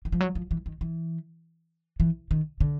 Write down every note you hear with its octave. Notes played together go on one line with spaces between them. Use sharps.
E3
F3
F#3
F3
E3
D#3
E3
E3
D#3
D3